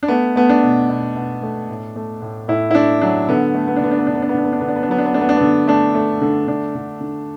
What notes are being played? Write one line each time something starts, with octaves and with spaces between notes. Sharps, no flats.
D4
A3 B3
A3 B3
D4
B2
B2
B2
A3
A2
A3
A2
A2 E4
E4
A3 D4
F#3 D4
D3 B3
A3
B3
D4
D3 B3
D4
B3
D3 D4
B3
D4
B3
D3 D4
B3
D4
D3 B3
D4
B3
D4
F#3 B3
D4
B3
A3 D4
B3
D4
D3 B3
A3 D4
A3
D3
D3 D4
D3
D3